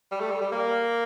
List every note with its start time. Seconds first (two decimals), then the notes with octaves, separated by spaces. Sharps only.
0.11 G3
0.20 A3
0.31 G3
0.41 G3
0.52 A#3